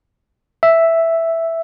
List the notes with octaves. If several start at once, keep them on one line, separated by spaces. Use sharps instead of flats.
E5